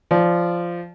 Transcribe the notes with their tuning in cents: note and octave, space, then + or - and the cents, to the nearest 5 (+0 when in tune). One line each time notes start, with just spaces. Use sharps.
F3 -10 D5 -5